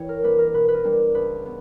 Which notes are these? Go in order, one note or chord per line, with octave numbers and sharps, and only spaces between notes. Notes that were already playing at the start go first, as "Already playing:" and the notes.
Already playing: E3 C#5 G5
A#4
G3 A#3 D4 B4
A#4
B2 B4
B4
A#4
G3 A#3 D4
C#2 B4
B3